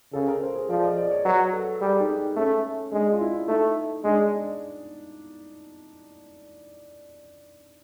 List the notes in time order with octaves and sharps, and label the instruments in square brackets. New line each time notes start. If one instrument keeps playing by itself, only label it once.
[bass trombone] C#3 [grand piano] A4
[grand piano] A#4
C5
G#4
[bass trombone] F3 [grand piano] D5
[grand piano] D#5
D5
C#5
[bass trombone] F#3 [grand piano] B4
[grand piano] A4
[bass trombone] G3 [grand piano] G#4
[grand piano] D#4
[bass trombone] A3 [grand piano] C#4
[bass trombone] G#3 [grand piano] D4
[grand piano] F4
E4
[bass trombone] A3 [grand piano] D#4
[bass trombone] G#3 [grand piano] D4